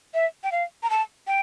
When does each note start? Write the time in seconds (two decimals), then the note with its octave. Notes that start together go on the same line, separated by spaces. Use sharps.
0.14 E5
0.44 G5
0.52 F5
0.83 A#5
0.90 A5
1.27 G5